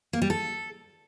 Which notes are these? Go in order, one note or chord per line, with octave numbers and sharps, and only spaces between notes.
A#3
G3
A4